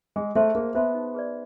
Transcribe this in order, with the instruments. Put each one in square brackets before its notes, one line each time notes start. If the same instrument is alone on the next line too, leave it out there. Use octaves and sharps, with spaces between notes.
[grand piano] G#3 [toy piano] G#4
[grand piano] A3 [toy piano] C5 E5 A5 C6
[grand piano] A#3 [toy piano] G#4
[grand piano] B3 [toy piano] C5 E5 A5 C6
[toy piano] D#4
G#4 B4 D5